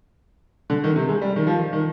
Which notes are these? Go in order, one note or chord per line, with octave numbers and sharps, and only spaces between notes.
D3
D#3
C3
G#3
G3
D#3
F3
D#3